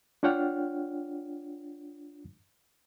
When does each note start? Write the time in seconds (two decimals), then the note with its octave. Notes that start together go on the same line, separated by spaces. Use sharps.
0.23 D4 F4 C#5 F#5 G5 F6